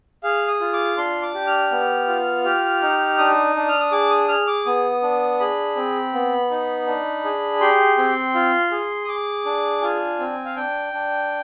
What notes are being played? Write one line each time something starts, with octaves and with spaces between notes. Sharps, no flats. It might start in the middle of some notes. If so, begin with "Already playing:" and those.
G#4 F5
D#6
F4
D6
D4 C6
D6
G4
F6
B3
F4
G4
D#4
D4 D#6
D4
F6
D#6
G#4 D6
D#6
G#4 F6
D6
B3 D#6
D4
G#4 B5
C4
B3
D#4
D4
G#4
G4 C6
C4
F4
G#4
D#6
G#4 D6
D4
F4 G#5
C4
F5
D4 G5
D4